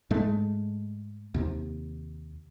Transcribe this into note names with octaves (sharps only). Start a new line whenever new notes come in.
G#2 G#3 A3
D#2 C3